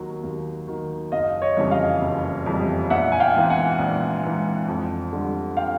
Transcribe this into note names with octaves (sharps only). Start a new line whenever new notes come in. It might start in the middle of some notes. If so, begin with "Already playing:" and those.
Already playing: D#2 D#3 F#3
D#2
D#3 F#3
F#1 D#5 F5
C#5 D#5
F2 C#3 E3 G3
D#5 F5
F#1
F2 C#3 E3 G3
A#1 E5 F#5
G#5
F5 G5
G#2 E3
F#5 G#5
A#1
G#2 E3
F2
D3 G3
F5 G5